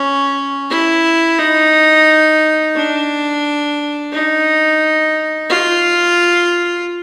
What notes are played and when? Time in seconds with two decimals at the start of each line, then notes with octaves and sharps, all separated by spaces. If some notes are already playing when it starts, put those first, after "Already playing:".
Already playing: C#4
0.70 E4
1.39 D#4
2.76 D4
4.12 D#4
5.50 F4